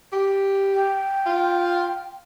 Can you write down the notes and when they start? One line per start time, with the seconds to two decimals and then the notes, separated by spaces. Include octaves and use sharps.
0.13 G4
0.74 G5
1.26 F4